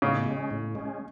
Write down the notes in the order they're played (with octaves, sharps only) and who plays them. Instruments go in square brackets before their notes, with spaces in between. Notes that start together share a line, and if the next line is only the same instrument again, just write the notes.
[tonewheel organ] A2 [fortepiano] C#3
[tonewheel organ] G#3 C#4
A2
G#3 C#4